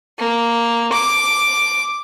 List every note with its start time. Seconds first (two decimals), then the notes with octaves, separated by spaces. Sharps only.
0.18 A#3
0.92 D6